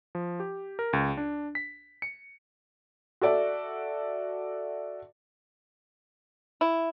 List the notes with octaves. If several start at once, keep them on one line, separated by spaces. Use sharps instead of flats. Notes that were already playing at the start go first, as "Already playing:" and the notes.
F3
G4
A#4
C#2
D4
B6
C#7
F#4 A4 D5 E5
E4